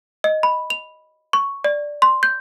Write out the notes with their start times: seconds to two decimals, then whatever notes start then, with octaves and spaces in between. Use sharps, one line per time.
0.24 D#5
0.43 B5
0.70 F7
1.33 C#6
1.64 D5
2.02 C6
2.23 G6